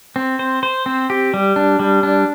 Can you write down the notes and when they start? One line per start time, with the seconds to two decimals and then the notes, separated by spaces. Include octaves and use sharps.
0.16 C4
0.39 C5
0.63 C5
0.86 C4
1.10 G4
1.34 G3
1.56 D4
1.80 G3
2.03 D4